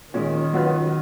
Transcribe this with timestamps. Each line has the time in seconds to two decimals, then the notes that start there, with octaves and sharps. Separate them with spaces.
0.14 A#2 D#3 G#3 C#4
0.53 F#3 C#4 F4 B4